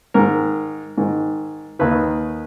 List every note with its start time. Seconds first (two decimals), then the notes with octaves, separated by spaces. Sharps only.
0.14 G#2 D#3 A#4
0.98 G#2 D#3
1.79 D#2 D#3 B4